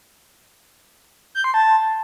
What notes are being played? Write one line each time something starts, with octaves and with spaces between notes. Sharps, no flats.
G6
C6
A5